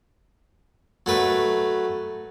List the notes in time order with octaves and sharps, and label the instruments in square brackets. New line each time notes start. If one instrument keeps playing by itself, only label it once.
[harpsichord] F#3 A3 B4